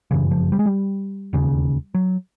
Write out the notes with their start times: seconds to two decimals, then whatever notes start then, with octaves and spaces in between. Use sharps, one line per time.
0.11 G1 F#2 C#3 E3
0.31 F3
0.52 G3
0.59 G#3
0.66 G3
1.33 E1 D#2 C#3
1.94 F#3